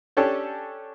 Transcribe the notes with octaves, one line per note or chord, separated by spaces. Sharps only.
C#4 D4 G4 A4 C#5